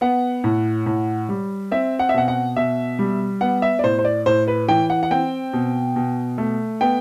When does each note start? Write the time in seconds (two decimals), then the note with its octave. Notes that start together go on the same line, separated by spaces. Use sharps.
0.01 B3 F#5
0.44 A2
0.86 A2
1.29 G3
1.71 C4 E5
1.99 F#5
2.09 E5
2.14 B2 F#5
2.28 F#5
2.56 B2 E5
2.99 G3
3.41 B3 F#5
3.62 E5
3.79 D5
3.84 A2 C5
3.99 C5
4.05 D5
4.26 A2 C5
4.48 B4
4.68 E3 G5
4.90 F#5
5.03 F#5
5.11 C4 G5
5.53 B2
5.96 B2
6.38 A3
6.81 B3 G5